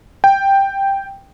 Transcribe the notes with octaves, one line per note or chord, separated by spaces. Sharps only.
G5